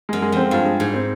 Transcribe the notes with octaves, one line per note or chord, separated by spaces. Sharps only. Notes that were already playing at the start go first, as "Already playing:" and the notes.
F#2 G#3
G#3
F2 C4
G2 F4
G#3
G#2 G#3
C4